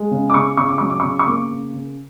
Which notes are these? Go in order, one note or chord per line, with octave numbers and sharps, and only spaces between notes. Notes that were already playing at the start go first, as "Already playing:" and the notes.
Already playing: G#3
C#3
D6
C#3 C#6
C#3 C#6
D6
F#3 C#6
D6
C#3 C#6
C#6
A#3 D6
C#3
C#3